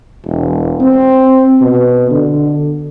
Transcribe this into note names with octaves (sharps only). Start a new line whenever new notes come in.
E1
C4
B2
D3